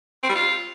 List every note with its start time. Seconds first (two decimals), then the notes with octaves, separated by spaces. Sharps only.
0.23 C4
0.29 G3
0.35 F4